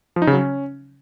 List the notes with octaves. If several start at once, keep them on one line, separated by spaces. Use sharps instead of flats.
F3
D#4
C#3
F#3
C#4